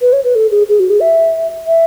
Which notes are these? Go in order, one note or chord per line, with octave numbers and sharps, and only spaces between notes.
B4
C#5
B4
A4
G#4
G#4
F#4
G#4
E5
E5